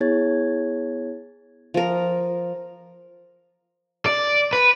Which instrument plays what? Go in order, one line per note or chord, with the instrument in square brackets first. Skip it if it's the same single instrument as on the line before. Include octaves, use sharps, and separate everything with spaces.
[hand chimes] B3 E4 G#4 C#5 G#6 A6
[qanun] F3 A#4
[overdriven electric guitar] D5
B4